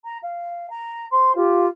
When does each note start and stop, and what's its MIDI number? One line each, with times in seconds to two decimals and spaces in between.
0.05 0.17 82
0.23 0.67 77
0.70 1.06 82
1.11 1.35 72
1.11 1.35 84
1.36 1.66 65
1.36 1.66 67